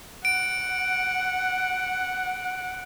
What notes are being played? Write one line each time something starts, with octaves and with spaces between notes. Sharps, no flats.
F#5 D7